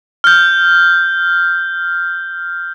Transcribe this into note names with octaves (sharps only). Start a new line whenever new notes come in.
F6 G6